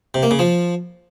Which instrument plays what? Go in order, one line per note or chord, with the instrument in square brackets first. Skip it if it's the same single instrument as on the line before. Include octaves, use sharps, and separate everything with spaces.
[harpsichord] C3
A#3
C#3
F3